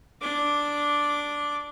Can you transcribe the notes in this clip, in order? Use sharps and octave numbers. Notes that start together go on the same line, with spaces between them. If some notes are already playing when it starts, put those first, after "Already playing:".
D4 D6